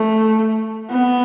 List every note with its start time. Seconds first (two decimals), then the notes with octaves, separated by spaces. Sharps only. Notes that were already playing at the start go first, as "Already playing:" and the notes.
Already playing: A3
0.90 B3